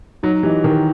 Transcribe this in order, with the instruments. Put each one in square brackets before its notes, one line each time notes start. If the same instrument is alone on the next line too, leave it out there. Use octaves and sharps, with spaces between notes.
[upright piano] F#3 [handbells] D#4
[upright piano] E3 [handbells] G4 D#5
[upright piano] D#3 [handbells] D#4